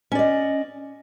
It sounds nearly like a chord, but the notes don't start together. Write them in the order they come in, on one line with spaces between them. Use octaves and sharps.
C#4 D5 D#5